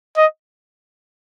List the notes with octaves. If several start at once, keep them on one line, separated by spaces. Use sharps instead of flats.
D#5